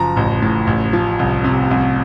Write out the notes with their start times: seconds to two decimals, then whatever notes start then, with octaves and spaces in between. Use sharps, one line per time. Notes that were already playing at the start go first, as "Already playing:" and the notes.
Already playing: F#1 F3 A#5
0.16 A1
0.42 A2
0.67 A1
0.93 F3
1.19 C2
1.44 C3
1.71 C2